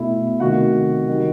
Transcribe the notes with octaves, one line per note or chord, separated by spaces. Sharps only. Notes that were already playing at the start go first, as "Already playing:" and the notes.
Already playing: B2 A3 E4 E5
C3 D#3 A3 F#4 F#5
D#3 G3